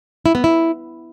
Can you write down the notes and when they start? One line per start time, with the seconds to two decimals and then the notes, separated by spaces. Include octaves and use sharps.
0.26 E4
0.35 B3
0.44 E4